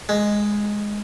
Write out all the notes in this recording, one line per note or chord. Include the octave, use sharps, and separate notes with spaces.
G#3